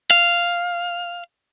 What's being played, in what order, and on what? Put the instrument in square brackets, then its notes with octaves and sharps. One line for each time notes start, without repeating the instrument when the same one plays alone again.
[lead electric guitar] F5